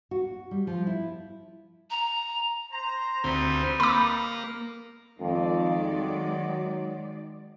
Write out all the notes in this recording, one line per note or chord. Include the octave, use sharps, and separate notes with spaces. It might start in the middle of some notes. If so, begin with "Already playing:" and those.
F#4
G3
F3
E4
A#5
C5 A#5
D2 G3 C4 D#4 B4
A#3 B5 D6
F2 D#3 G#3 D5
F#3